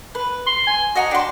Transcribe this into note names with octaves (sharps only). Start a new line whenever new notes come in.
B4
C6
G#5
F#4 D#5 F#5 A#5
D4 G5 C6